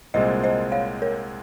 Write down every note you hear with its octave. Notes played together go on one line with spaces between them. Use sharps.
C2 A#2 G#3 C4 C5 D#5
C5 D#5
C#5 F5
A#4 C#5